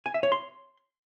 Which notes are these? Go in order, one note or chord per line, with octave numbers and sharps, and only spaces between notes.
G#5
E5
C#5
C6